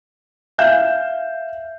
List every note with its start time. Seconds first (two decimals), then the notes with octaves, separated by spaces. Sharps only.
0.58 E5 F5 G6 E7